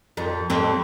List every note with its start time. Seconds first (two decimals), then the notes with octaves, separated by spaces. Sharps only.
0.17 F2
0.50 F2 C4